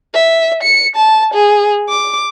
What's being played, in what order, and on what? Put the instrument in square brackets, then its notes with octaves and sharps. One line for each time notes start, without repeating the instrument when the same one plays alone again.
[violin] E5
C#7
A5
G#4
D6